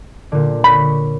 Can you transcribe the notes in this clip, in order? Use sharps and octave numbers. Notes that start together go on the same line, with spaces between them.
A#2 D3
C#5 B5